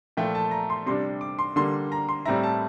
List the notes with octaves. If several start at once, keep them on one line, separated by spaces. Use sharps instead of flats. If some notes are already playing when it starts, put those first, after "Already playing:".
A#2 F3 A3 E4 G5
A5
A#5
C6
C3 G3 D4 C6
D6
C6
D3 G3 A#3 C6
A#5
C6
A2 G3 C4 E4 A#5
A5